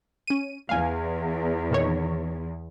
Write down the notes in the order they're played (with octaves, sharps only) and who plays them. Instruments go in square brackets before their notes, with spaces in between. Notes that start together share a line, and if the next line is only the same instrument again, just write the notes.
[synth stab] C#4 D#7
[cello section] E2 [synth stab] F5 G#5
[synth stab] A#2 D#3 C#5